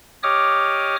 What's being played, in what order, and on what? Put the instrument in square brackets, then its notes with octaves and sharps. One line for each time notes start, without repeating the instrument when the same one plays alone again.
[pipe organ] G4 C#5 D#5 D6 D#6 F6